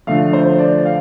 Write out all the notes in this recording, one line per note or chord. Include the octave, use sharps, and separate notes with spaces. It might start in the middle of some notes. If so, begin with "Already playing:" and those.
D3 F3 A3 F5
C5
D5
F5